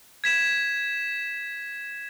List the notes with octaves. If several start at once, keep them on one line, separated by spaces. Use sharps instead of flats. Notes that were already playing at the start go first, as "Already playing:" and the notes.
G#6 B6 E7